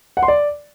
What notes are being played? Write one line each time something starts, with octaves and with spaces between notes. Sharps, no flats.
F#5
C6
D5